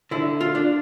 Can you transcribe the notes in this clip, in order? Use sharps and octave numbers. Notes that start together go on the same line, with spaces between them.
D3 E4
F4
D4